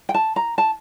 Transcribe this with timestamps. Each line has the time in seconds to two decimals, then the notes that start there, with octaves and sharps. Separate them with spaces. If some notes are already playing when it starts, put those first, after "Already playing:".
0.09 G5
0.14 A5
0.36 A#5
0.58 A5